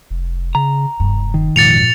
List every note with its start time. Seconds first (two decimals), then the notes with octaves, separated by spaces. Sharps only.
0.11 F1
0.55 C#3 A#5
1.00 F1 G2
1.34 D#3
1.56 G#1 F2 A#2 A6 C#7 F7